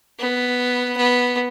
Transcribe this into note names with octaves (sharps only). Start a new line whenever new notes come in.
B3
B3